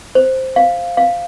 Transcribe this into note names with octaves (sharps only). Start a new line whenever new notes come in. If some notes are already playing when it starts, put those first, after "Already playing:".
C5
F5
F5